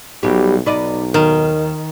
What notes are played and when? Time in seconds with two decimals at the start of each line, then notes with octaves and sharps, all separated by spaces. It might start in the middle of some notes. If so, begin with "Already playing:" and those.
0.23 B1 B2 G3 G4
0.66 B1 D#4 B4 D5 D#5
1.14 D#2 D#3 A#4